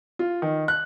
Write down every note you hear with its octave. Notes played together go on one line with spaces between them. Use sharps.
F4
D#3
F#6